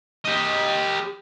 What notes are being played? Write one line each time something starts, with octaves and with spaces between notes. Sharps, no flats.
G4 D#5